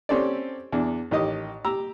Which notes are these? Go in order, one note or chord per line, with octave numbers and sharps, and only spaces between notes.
C4 C#4 G4 A4 D5
E2 D4
A1 D#3 G4 D#5 D#6
G4 A#5 E6